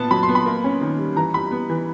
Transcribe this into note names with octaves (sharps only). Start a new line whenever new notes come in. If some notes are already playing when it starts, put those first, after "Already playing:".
Already playing: A#2 B3 A5
F#3 B5
C6
B3
B5
A#3
C#4
D#3
G3
E3 A#5
G3 B5
B3
E3